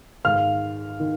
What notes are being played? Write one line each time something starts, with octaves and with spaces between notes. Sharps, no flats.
G#2 D#3 F5 F6
D#3